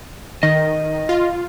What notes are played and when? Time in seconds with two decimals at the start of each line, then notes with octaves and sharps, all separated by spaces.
0.43 D#3 D#5
1.09 F4